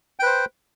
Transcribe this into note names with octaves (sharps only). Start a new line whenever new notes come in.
B4 C5 G5